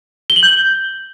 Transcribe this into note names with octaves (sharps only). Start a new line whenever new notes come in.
G7
F#7
G6